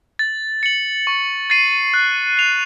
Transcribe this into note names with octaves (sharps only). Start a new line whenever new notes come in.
A6
C#7 F#7
C#6
A6 C7 D#7
F#6
C7 F7